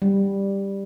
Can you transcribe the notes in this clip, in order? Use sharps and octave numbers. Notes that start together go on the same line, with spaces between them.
G3